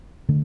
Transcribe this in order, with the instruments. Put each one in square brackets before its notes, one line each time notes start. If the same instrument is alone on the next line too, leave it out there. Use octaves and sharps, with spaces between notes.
[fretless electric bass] D3 A3